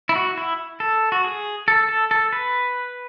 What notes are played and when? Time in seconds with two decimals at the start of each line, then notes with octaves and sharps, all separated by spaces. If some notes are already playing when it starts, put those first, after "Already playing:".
0.09 E4
0.15 F#4
0.37 E4
0.80 A4
1.12 F#4
1.25 G#4
1.68 A4
1.89 A4
2.11 A4
2.32 B4